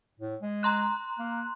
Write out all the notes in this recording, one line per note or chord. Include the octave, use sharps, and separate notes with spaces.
A2
G#3
A#5 C6 F#6
A#3